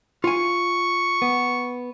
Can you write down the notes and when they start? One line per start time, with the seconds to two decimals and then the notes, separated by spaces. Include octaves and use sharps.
0.24 F4 G#5 C#6
1.22 B3